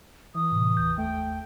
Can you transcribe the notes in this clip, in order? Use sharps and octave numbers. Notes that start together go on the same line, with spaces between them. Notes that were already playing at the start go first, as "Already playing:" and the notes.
E3 D#6
A2 C3
G1 D#2 G6
A3 G5